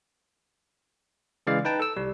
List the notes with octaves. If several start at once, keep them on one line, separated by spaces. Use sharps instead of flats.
C#3 E3 G#3 D5 F5
D#4 B4 G5 A5
A4 E6
C2 G3